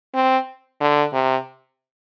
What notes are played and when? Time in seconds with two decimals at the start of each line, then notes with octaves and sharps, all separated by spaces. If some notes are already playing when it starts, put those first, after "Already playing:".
0.14 C4
0.81 D3
1.13 C3